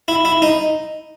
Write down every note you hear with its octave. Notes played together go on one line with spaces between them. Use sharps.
E4
E4
D#4